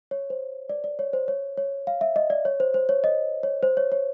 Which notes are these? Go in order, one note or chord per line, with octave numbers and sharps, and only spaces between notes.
C#5
C5
D5
D5
C#5
C5
C#5
C#5
F5
E5
D#5
D5
C#5
C5
C5
C#5
D#5
C#5
C5
C#5
C#5